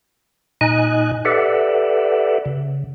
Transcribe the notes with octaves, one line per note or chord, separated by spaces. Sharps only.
A#2 D#4 D#5 G#5 F#6
G4 A4 B4 D5 E5 F#5
C#3